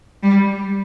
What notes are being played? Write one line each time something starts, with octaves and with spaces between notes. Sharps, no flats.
G3